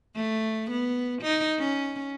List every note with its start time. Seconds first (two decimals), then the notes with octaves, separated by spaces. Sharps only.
0.15 A3
0.70 B3
1.21 D#4
1.58 C#4